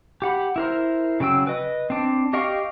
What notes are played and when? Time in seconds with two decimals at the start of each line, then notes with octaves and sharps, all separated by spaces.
0.22 G4 F#5 B5
0.56 E4 A#4 C5
1.20 C#3 F#3 G5 E6
1.47 B4 D#5
1.90 C4 D4
2.33 G4 D#5 F5 G5 C#6